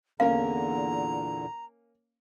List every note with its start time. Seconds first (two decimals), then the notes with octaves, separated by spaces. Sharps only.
0.20 E2 A#2 D3 A#3 C#4 A#4 F5 A#5